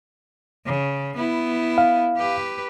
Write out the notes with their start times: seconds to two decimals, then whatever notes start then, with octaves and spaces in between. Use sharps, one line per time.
0.66 C#3
1.16 B3 E4
1.78 F5
2.17 G4 B4